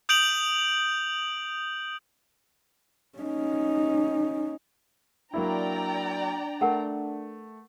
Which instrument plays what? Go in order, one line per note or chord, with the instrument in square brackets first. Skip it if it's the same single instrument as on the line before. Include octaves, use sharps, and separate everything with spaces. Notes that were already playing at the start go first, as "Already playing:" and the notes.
[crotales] D#6 G6 D7 F7 F#7
[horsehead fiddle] C#4 D#4
[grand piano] F#3 A#3 E4 [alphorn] D4 [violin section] D5 G5 A#5
[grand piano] A3 [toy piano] A#4 F#5 A5